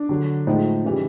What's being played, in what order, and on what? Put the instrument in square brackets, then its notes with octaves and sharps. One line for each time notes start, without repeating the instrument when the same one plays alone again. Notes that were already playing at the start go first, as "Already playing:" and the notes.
Already playing: [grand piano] D4
D3 F#3
A2 F3 G#3 D#4
C#3 E3 G3